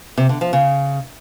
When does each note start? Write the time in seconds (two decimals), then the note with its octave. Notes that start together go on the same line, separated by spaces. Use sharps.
0.17 C3
0.29 D3
0.41 F3
0.53 C#3